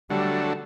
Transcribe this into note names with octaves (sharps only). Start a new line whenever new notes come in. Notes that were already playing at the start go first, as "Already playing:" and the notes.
D3 F#3 G3 A3